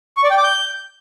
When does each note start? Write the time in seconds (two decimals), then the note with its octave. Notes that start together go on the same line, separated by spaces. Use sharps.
0.17 C#6
0.24 D5
0.30 G5
0.37 D6
0.44 G6